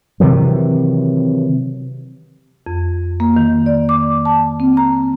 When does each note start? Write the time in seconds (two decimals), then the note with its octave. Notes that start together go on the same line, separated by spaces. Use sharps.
0.20 C3 D#3 E3 F#3
2.67 F2
3.20 A#3
3.37 D#3
3.66 D5
3.89 D6
4.25 A5
4.60 C4
4.77 A#5